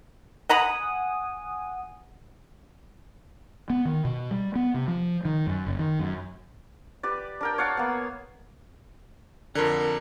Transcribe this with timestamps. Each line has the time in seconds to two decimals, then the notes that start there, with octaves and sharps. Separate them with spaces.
0.49 D#5 F#5 G#5 A#5 B5 D#6
3.70 B3
3.85 D#3
4.05 B2
4.31 G3
4.55 B3
4.74 C3
4.88 F3
5.25 D#3
5.47 F#2
5.67 F#1
5.79 D#3
5.99 F#2
7.03 G4 B4 D5
7.41 D4 A#4 G5
7.58 C#5 F5 F#5 A5
7.77 A#3 B3
9.55 F2 D3 A#4